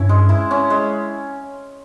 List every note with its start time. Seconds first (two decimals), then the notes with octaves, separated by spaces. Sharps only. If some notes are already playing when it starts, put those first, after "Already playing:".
Already playing: G2 C#4 E4
0.09 G#3
0.29 E4
0.51 C#4
0.70 G#3